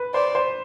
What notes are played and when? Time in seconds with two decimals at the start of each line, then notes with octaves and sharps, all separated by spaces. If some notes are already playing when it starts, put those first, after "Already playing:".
Already playing: B4
0.14 C5 D5
0.35 C5